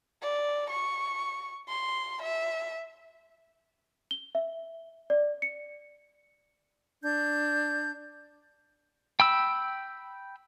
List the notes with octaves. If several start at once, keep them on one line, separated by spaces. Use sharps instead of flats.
D5
C#6
C6
E5
G7
E5
D5
C#7
D4 G6
G5 B5 E6